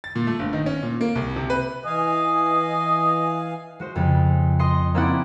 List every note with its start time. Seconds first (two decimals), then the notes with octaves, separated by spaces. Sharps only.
0.04 A6
0.15 A#2
0.27 A3
0.39 G1
0.53 D#3
0.66 C#4
0.83 A#2
1.01 A#3
1.15 C2
1.36 C3
1.50 B4
1.85 E3 D#5 F5 G#5
3.80 G#3 F#4 C5
3.96 F2 C#3 G#3
4.59 D#5 C6 C7
4.94 A#3 C4 C#4 E4 D5 F#5